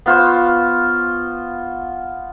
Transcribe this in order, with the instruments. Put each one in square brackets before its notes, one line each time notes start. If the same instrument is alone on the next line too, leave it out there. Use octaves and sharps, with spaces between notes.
[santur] B3 F4 C5 C#6